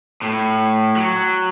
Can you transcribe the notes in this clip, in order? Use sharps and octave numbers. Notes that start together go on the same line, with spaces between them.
A2
F#3